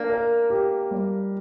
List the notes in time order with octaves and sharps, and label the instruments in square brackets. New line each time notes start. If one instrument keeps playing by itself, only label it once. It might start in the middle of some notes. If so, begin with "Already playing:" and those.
Already playing: [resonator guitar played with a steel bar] A#3 [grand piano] D4
[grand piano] A#4
G4
G3